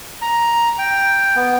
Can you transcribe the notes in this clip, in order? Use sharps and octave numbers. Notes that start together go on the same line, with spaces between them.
A#5
G5
B3